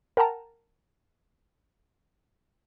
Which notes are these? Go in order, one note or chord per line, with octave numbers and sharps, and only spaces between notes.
A#4 F#5 G5 A5 A#5